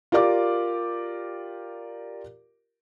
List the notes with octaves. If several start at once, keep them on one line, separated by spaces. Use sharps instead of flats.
F4 G4 A#4 D5 D6